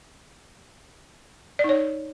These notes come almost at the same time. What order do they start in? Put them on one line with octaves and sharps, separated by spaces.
D5 D#4 C#5